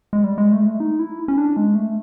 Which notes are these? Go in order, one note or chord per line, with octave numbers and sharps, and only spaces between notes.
G#3
G3
G#3
A3
G#3
A3
D#4
E4
C#4
D4
G#3
A3